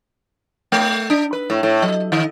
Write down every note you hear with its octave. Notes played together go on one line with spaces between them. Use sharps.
A3
D4
B4
A2
A2
F#3
D#3